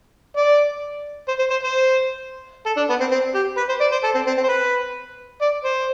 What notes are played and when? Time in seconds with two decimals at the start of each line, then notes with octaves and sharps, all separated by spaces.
0.37 D5
1.29 C5
1.39 C5
1.51 C5
1.63 C5
2.66 A4
2.77 D4
2.90 B3
3.01 C4
3.11 C4
3.35 G4
3.57 B4
3.69 C5
3.81 D5
3.92 C5
4.04 A4
4.15 C4
4.27 C4
4.38 C4
4.44 C5
4.49 B4
5.41 D5
5.65 C5